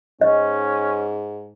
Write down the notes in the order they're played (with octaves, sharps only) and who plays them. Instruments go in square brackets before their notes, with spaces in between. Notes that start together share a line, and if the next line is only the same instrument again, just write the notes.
[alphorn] G#2 [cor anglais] C#4 [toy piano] D#5